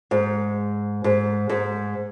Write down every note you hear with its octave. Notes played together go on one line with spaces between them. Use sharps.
G#2
G#2
G#2